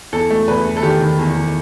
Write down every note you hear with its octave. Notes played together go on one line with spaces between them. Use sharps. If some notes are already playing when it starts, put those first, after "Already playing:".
E2 A4
A3
E2 B4
E2
A4
D#3 G4
D#3
E2
E2